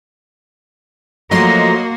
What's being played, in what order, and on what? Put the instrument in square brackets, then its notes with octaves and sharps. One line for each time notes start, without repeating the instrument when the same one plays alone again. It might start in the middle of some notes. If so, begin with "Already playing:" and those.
[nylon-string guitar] F3 A3 [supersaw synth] F#3 D#5 C6 [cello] A#3 F#4 [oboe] A#5